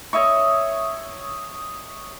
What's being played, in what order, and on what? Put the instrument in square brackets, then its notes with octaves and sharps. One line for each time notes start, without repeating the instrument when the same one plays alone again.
[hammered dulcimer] C#5 D#5 E5 C#6